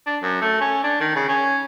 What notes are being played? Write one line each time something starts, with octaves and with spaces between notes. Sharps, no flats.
D4
F#2
A3
C#4
D4
D#3
C#3
C#4